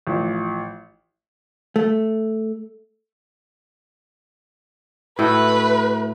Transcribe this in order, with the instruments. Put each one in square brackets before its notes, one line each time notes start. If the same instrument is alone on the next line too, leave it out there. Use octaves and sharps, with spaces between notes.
[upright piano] A1 F3
[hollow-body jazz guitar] A3
[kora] A2 A3 F#4 [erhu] B4